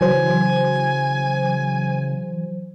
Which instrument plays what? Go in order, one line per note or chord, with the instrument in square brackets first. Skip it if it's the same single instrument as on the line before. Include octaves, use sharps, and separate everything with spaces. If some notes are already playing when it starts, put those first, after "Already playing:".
[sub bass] C#3 [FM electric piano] E3 F#3 C5 [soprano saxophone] G#5